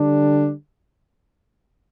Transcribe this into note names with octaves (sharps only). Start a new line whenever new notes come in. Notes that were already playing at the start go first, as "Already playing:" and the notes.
Already playing: D3 G3 D4